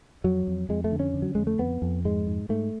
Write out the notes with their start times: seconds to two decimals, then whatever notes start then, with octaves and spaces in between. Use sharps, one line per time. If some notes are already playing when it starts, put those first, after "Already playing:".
0.24 F2 F#3
0.47 F2
0.69 F2 G#3
0.84 A3
0.92 D3
1.00 C#4
1.14 D3
1.22 F#3
1.35 F2 G#3
1.47 A3
1.59 F2 B3
1.82 F2
2.05 G#2 G#3
2.27 G#2
2.49 G#2 A3